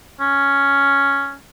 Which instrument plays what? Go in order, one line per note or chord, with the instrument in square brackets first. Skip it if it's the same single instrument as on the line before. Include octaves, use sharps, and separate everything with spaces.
[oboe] C#4